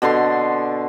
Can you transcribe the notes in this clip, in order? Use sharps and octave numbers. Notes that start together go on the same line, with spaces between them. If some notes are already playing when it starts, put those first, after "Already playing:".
B2 D3 A4 C6